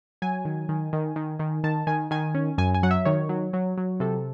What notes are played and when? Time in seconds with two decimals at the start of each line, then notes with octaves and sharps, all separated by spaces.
0.22 F#3 G#5
0.45 D#3
0.69 D#3
0.93 D#3
1.16 D#3
1.39 D#3
1.64 D#3 A5
1.87 D#3 G#5
2.11 D#3 G#5
2.35 C#4
2.58 F#2 G#5
2.74 G#5
2.83 F#3 F#5
2.91 E5
3.05 D#3 C#5
3.29 F#3
3.53 F#3
3.78 F#3
4.00 C3 A4